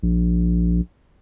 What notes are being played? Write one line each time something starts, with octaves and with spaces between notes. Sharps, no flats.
A#1